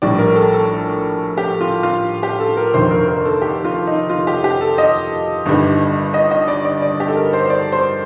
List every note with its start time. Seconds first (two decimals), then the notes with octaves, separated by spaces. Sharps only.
0.02 A#1 A2 G3 D5
0.19 A#4
0.36 A4
0.53 A4
1.37 G4
1.61 F4
1.83 F4
2.23 G4
2.40 A4
2.57 A#4
2.74 F1 D#2 D3 C5
2.91 A#4
3.08 A#4
3.25 A4
3.42 G4
3.65 F4
3.87 D#4
4.10 F4
4.27 G4
4.44 G4
4.61 A4
4.78 D#5
5.46 G1 G2 D#3 G3
6.14 D#5
6.31 D#5
6.48 D5
6.65 D5
6.82 D5
7.00 G4
7.08 A4
7.16 A#4
7.33 C5
7.44 C5
7.50 D5
7.72 C5